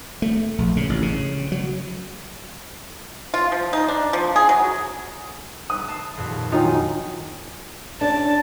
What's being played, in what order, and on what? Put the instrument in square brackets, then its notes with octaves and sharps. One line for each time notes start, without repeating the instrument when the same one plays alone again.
[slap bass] A3
A#1
C#3
A1
C#3
F#3
[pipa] F4
F3
D#4
D4
F3
G#4
F#3
[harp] B4 [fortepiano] D#6
[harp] A5 C7
D#1 F2 B4
[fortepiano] D#3 F#3 D#4 [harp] F4 G#5
[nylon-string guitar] C#4 D4 [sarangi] A5